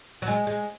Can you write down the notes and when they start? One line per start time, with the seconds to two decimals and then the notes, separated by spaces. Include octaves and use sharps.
0.22 F#3
0.27 G#3
0.47 G#3